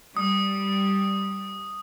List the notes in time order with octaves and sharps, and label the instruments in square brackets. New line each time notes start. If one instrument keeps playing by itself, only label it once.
[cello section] G3 [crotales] D#6